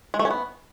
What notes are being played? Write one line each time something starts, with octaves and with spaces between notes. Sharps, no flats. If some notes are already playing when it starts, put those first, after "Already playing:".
G#3
A3
C#4
B3